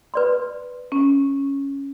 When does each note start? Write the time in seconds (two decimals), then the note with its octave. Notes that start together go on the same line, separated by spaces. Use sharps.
0.14 B4 D5 C6
0.92 C#4